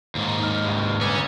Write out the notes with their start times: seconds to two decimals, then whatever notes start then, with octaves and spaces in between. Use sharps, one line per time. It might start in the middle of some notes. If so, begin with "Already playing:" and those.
0.15 D#2 G#2
0.39 D#4 F6
0.64 C#2 G2
1.01 G1 C#4 B4 A#5